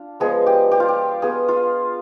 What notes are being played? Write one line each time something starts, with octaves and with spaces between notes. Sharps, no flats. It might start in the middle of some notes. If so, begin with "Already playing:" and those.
Already playing: D4 F4
F3 G#3 B3 G#4
G4
G4
F4
G4
B3 F4 G#4
F4